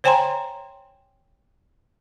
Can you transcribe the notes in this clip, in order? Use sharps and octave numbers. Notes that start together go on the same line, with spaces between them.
C5 C#5 G5 G#5 A#5 C6